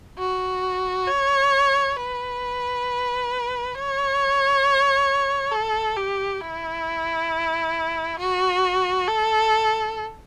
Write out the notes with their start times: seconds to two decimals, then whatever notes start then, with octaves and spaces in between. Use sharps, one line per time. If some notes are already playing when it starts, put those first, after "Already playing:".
0.18 F#4
1.07 C#5
1.96 B4
3.75 C#5
5.51 A4
5.96 G4
6.41 E4
8.19 F#4
9.07 A4